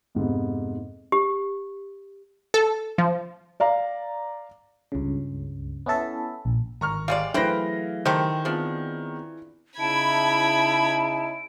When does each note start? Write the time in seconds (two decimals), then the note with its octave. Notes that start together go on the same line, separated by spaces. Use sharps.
0.15 F2 G#2 C3 B3
1.12 G4
2.54 A4
2.98 F3
3.60 D5 F5 A#5
4.92 C#2 G2 C#3
5.86 B3 C#4 E4 A4 E5
6.45 A#1
6.81 G1 G#2 D#3 A#5 C#6 F6
7.08 G3 G#3 D5 F5
7.34 E3 F#3 A3 G#4 B4 C5 G5 A#6
8.06 D#3 G4 A4 C5
8.45 F3 B3 C4 D4 G#4
9.79 C#3 D#4 E4 A5 B5 G#6 D7